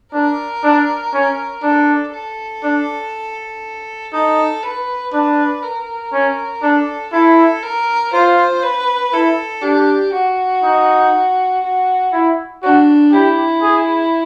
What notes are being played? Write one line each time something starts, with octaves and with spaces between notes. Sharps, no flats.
D4 A#4
D4
C#4
D4 A4
A4
D4
D#4 A4
B4
D4 B4
A#4
C#4
D4 A4
E4 A4
A#4
F4 C5
B4
E4 A4
D4 G4
F#4
D#4
F#4
E4
D4 F#4
E4 G4
G#4